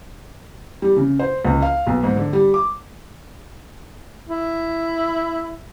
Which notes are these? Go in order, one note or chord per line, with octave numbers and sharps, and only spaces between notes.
G3
C#3
C5
C#2
F5
B1
G#2
D3
G3
D6
E4